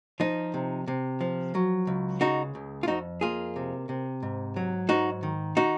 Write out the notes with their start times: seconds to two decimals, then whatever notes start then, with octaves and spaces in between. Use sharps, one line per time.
0.20 F3 D#4
0.54 C3
0.88 C3
1.21 F3
1.55 F#3
1.87 C#2
2.21 C#3 D#4 F#4
2.55 C#2
2.83 F4
2.88 F2 D#4 F#4
3.21 A#3 F4 G#4
3.56 C3
3.89 C3
4.23 G#2
4.56 F#3
4.89 G#2 D#4 F#4
5.23 D#3
5.57 D#4 F#4